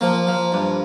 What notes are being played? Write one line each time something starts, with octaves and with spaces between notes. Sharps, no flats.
F3 A#3
F3
G2